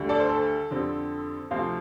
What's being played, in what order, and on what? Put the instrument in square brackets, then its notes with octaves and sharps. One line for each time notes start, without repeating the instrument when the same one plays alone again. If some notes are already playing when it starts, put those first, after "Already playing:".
Already playing: [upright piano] D2 D3 G3
A4 D5
C5
A4
F2 D3 G3 C4
D2 C3 F3 C4 C5 F5